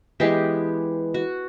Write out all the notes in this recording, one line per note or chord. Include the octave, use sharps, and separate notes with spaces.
E3 G#3 B3 G4
F#4